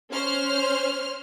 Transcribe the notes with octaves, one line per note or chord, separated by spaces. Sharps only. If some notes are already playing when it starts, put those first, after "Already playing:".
C#4 C5 F6